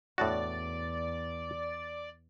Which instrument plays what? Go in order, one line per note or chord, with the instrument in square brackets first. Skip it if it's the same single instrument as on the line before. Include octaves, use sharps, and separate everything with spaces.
[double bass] E2 [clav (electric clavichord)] A2 D4 F#4 [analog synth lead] D5